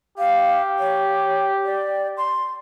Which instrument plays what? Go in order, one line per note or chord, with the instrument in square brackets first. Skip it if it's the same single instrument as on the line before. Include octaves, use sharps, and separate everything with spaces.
[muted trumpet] G4 [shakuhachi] F5
[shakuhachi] C#5
D5
C6